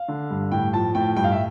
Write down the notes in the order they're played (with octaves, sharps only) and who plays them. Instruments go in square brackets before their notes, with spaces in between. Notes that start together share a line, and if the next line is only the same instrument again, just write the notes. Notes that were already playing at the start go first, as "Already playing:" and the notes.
Already playing: [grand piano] F5
D3
G2
A2 G5
F3 A5
A2 G5
G2 G5
F5
E5